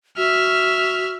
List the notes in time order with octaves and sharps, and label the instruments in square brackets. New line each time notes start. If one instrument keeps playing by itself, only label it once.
[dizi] F#4 [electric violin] E5 F6